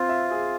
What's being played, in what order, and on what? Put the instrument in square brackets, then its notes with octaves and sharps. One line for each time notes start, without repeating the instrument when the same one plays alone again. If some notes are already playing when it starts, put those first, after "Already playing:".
Already playing: [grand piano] C4 [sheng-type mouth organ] F4
[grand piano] E5
G#4